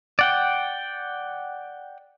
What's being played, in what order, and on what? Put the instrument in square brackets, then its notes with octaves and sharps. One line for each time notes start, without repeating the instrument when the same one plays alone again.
[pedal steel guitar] D5 F#5 G5